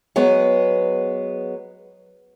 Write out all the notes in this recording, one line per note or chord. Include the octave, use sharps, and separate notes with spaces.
F#3 G#3 B3